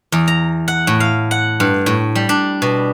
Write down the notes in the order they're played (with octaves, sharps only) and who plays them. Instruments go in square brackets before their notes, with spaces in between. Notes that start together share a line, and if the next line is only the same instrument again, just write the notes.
[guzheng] E2
A#5
F#5
A2
F5
F#5
G2
A2
G3
D4
B2